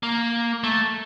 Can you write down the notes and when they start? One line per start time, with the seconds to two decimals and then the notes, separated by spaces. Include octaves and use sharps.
0.03 A#3
0.64 A3